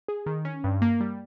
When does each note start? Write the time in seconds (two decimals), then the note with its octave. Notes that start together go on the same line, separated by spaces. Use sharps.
0.08 G#4
0.26 D#3
0.45 C#4
0.64 G2
0.82 A#3
1.00 G3